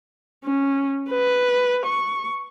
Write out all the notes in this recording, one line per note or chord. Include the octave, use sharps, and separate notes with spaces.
C#4
B4
C#6